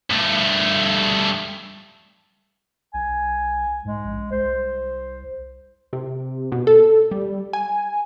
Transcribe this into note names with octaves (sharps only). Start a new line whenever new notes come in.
G2 A3
B1 G#5
G#2 G#3
A#1
C2 C5
C3
B2
A4
G3
G#5